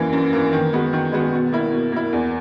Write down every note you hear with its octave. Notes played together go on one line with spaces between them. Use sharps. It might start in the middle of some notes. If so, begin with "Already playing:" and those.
Already playing: F#2 E3 A#3
F#2
E3 A#3
D#3
G#3 B3 F#4
D#3
G#3 B3 F#4
B2
A#3 E4
B2
A#3 E4
E2